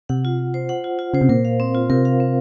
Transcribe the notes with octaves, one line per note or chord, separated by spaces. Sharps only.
C3 F#5
F4
F4
C5
F#5
F4
F4
C#3 C5
C3
A#2 A#4
F5
C4
F4
C3 A#4
F5
C4